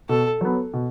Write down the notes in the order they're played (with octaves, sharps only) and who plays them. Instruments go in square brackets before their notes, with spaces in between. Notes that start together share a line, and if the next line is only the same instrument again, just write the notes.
[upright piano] B2 [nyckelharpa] A4
[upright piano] F#3 B3
B2